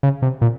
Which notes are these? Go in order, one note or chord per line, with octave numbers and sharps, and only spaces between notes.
C#3
C3
A#2